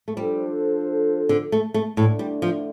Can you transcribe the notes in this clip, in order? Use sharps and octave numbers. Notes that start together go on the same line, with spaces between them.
A3
F3 G3 D4 A4 C5
D3
A3
A3
A2 D3 A3 D4
G3
F3